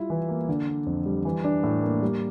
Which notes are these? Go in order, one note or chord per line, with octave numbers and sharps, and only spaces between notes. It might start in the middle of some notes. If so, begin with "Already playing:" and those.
Already playing: G3 E4 F4
E3
A#3
D3
D4
F2
G3
E3
D4
A2
A#3
G3